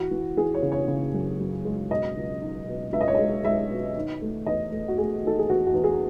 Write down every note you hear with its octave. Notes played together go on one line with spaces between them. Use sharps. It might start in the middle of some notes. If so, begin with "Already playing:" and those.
Already playing: E3 F#4
E3
E3 G#4
C#5
C#3
C#5
C#3
F#2
F#2
G#3
B2 D#5
C#2
D#4
B2
C#2 E5
D#5
C#5
G#3 D#5
G#3 E5
B2
D#3
A3
E2 D#5
A3
F#4
A3 G#4
D#3 A4
G#4
E2 F#4
F#4
E2
G#4